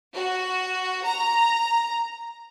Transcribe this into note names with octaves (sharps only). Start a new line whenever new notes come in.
F#4
A#5